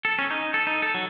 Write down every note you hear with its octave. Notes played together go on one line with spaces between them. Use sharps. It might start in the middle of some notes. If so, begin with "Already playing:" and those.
A4
C#4
D#4
A4
D#4
A4
F#3